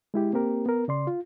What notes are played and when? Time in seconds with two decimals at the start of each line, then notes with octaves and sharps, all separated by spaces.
0.14 G#3 E4 G4
0.33 A#3 C4 G4 A#4
0.66 B3 A#4
0.88 C#3 D5 C6
1.07 F4